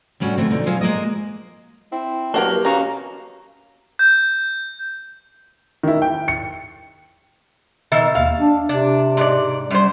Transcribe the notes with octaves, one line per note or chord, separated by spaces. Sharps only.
A2 G3 C#4 D4 F#4
D3 F3 A3 C4
B2 D3 D#4
F#3 F4 G#4 C5
G#3 A#3 D#5
C4 E4
B2 F#3 A#3 G4 A#4 F#5 A5
C#4 F#4 C#5 F5 A#5
G6
D#3 E4
G5
C#7
B2 D#3 E5
D#2 F5
D4
C3 D4
G#2 D5
F#2 G3 C5